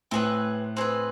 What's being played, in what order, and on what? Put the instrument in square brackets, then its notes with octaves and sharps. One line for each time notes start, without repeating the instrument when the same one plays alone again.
[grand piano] A2 [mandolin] C4 G#4 B4
[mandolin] C4 G#4 B4